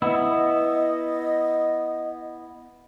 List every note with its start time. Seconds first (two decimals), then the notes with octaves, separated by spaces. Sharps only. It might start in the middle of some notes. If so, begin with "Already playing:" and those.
0.02 B3 E4 D#5 E5